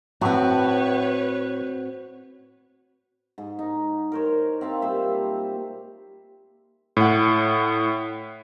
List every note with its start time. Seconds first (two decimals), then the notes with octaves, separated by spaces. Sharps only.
0.21 A2 C4 F#4 B4 C#5
3.38 G#2
3.59 D#4
4.12 A#4 C5 C#5
4.61 C4 E5 F5 A5
4.82 A#2 G3 C5 E5
6.97 A2 F#5